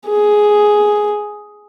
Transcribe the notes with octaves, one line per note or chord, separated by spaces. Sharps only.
G#4